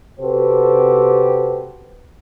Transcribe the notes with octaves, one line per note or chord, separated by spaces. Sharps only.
C3 F#4 G4 A4 B4 C5